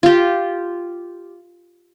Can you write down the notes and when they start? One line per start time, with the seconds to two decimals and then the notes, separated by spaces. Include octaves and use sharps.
0.03 F4 G4